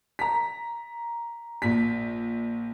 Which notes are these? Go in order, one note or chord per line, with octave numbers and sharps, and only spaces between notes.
A#5 B6
A#1 B6